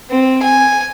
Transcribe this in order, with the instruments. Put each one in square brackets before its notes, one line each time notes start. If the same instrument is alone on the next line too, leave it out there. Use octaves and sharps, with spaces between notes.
[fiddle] C4
G#5